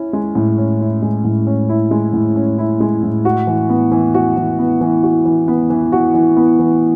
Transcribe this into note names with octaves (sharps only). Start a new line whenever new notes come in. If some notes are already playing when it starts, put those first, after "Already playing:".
Already playing: C#4 E4
G#3
A2
C#4
E4
G#3
A2
C#4
E4
G#3
A2
C#4
E4
G#3
A2
F#4
E3
B3
E3
F#4
E3
B3
E3
F#4
E3
B3
E3
F#4
E3
B3
E3